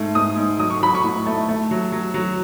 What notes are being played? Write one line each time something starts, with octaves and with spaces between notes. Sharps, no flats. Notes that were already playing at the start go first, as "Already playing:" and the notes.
Already playing: G#2 A3
G#2 D#6
G#2
F#3 D#6
C#6
F#3 B5
C#6
A2
A3
A3
F#3
F#3
F#3